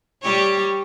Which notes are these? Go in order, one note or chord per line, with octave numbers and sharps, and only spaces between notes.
G3 G4 C#5